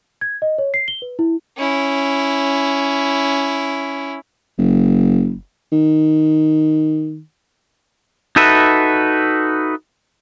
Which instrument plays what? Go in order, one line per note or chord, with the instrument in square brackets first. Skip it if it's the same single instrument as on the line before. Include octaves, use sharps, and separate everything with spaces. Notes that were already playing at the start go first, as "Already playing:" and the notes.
[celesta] G#6
D#5
C#5
C7
G7
B4
E4
[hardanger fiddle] C#4 E4
[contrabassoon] F#1
D#3
[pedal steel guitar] D#4 F#4 A4 B4 E5